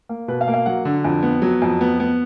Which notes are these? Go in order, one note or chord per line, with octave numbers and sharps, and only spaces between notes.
A#3
B2 B4
F5
A#3
F5
F#3 F#5
D3
F2
B3
F#3
F2
B3
B3